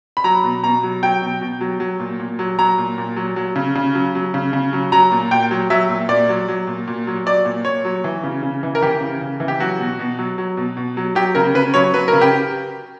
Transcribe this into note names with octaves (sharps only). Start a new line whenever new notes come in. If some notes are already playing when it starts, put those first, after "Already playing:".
B5
F#3 A#5
B2
B2 A#5
F#3
F#3 G5
B2
B2
F#3
F#3
A#2
A#2
F#3
F#3 A#5
A#2
A#2
F#3
F#3
C#3
C#3
F#3
F#3
C#3
C#3
F#3
F#3 A#5
A#2
A#2 G5
F#3
F#3 E5
A#2
A#2 D5
F#3
F#3
A#2
A#2
F#3
F#3 D5
A#2
A#2 C#5
F#3
E3
C#3
C#3
E3
A#4
E3 G4
C#3
C#3
E3
G4
F#3 F#4
B2
B2
F#3
F#3
B2
B2
F#3
F#3 G4
C#3 A#4
C#3 B4
F#3 C#5
F#3 B4
A#4
C#3
G4